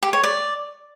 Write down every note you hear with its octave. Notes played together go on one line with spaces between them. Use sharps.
G4
C#5
D5